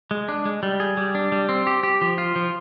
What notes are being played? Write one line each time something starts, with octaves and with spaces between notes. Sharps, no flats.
G#3
D4
G#3
G3
G#4
G3
D4
G3
C4
G4
G4
F3
F4
F3